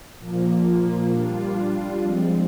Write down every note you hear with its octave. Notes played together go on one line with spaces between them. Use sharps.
A#2 F3 A#3
G3 D4 F4
F3 G#3 C4